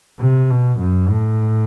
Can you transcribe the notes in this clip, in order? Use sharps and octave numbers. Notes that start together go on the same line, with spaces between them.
C3
B2
F#2
A2